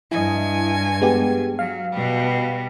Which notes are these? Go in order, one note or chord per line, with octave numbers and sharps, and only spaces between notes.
G2 E4 D#5 G#5
G#3 B3 G4
F#3 F5
B2 G3